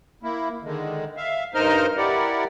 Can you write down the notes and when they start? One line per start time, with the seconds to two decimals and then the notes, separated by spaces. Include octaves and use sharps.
0.23 A#3 E4
0.64 D3 D#3 G#3
1.17 E5 F5
1.54 G2 D#4 A#4 C5 D#5 F6
1.97 E4 G4 A#4 D5 F#5